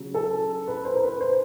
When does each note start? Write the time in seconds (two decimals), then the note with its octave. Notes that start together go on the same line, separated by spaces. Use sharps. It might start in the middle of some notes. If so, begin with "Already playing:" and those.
Already playing: C#3 F#3
0.14 A4
0.68 B4
0.85 C5
0.95 A#4
1.03 B4
1.21 C5